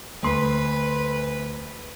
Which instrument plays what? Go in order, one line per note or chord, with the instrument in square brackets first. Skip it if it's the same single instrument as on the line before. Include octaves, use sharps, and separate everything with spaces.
[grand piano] D2 C6 [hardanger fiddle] B4